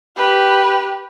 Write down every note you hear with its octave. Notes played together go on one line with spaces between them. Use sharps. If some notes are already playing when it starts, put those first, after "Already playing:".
G4 B4